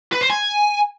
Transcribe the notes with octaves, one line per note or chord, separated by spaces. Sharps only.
B4
C5
G#5